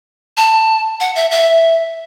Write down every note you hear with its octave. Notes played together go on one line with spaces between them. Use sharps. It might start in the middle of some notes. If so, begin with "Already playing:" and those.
A5
F#5
E5
E5